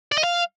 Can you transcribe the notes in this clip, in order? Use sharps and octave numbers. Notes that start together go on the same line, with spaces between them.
D5
D#5
F5